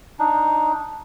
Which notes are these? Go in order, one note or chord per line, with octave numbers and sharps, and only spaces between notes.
D4 D#4